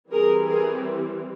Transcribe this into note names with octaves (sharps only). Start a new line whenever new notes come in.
E3 G3 C4 G#4 A#4
G#4 A#4